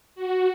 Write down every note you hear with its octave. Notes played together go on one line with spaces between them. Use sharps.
F#4